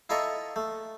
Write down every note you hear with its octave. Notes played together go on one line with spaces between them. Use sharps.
E4 F4 A4 D#5 A#5 C#6
A3